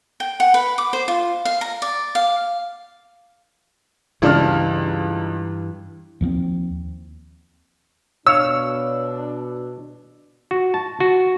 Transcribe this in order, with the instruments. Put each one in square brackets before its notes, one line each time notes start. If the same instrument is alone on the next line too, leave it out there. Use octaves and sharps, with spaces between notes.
[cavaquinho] G5
F#5
B4
D6
C5
F4
F5
A#5
D5
F5
[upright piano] C#2 D4 F6 [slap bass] G2 E3
[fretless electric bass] D#2 F3 G3 C4
[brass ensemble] B2 D4 [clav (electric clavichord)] C#5 F5 [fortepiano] E6
[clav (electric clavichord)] F#4
A5
F#4